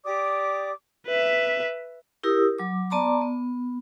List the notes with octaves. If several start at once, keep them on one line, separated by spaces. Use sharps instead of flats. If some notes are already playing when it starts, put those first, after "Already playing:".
G4 D5 D6 D#6
B4 E5
E4 G4 A#4 D#6 E6
F#3 D6
B3 D5 A5 A#5 C6 D6
B3